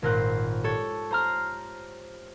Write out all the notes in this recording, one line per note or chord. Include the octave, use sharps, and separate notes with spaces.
G#1 A#2 A#4 C5 F#6
G4 A4 C#5
C5 A#5 F6